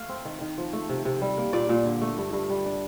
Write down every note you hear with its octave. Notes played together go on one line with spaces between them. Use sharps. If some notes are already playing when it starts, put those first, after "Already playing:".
Already playing: A3 F5
C4
D#3
D#3
F3
A3
C3
C3
G3
A#3
A#2 D5
A#2
D3
A3
G2
G2
G3
D4